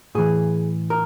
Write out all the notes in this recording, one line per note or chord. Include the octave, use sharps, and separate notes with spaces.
A2 E3 G#4
A#4